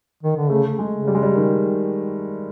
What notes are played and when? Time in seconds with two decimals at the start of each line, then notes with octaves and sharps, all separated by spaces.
0.23 D#3
0.36 D3
0.50 C#3 A3
0.79 G#3
0.93 C#3
1.08 G3
1.15 G#3
1.23 G3
1.35 D#3